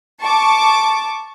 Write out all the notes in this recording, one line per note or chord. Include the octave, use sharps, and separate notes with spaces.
A5 C#6 D6